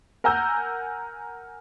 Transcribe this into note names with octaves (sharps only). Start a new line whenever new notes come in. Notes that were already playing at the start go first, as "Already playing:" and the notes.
A#4 F#5 G#5 A#5 E6 G6